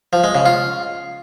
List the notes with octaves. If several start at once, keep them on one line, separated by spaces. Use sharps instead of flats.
F3
G#3
C#3
F4